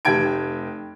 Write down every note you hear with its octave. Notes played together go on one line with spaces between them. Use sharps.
F1 G4 G5 G#6 D7